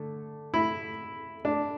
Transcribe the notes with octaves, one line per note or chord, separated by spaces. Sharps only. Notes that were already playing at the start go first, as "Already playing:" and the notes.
Already playing: D3 A3
E4
D4